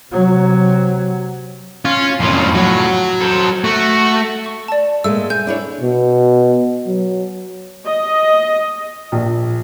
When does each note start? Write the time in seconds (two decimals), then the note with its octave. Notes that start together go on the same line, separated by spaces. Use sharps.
0.13 C3 F#3
1.85 C#4 F4
2.20 F2 A2 C#4 F4
2.55 F#3 F#4
3.21 A4 C5
3.64 A3 F#4
4.46 C#6
4.68 D5 A5
5.04 A#2 G#3 A3 E6
5.30 G#5 G6
5.47 D4 E4 C#5
5.81 B2
6.87 F#3
7.87 D#5
9.12 A#1